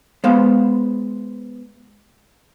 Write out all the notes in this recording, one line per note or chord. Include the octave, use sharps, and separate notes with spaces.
G#3 B3 C5 F5